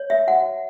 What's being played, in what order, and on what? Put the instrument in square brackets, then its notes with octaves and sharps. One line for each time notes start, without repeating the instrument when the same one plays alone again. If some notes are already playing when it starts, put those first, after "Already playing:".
Already playing: [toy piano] C#5
E5
F#4 F#5